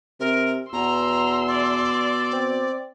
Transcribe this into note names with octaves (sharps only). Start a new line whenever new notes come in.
C3 A#4
E2 B2 A#5 C6 E6
D5
C4